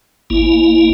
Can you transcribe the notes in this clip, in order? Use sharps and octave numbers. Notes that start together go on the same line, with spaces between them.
G#1 A#3 E4